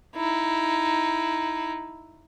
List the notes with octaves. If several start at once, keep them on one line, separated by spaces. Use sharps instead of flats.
D#4 E4